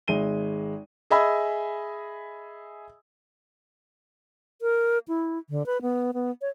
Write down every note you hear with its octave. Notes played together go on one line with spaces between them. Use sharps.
G#1 G#3 E5 D#7 G7
G#4 D#5 E5 G#5 B5 E6
A#4
E4
D3
B4
B3
B3
C#5